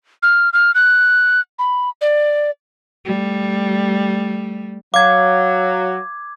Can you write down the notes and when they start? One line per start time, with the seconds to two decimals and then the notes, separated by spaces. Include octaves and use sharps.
0.23 F6
0.53 F6
0.75 F#6
1.59 B5
2.01 D5
3.05 G3 A3
4.94 F#3 F5 D6 G#6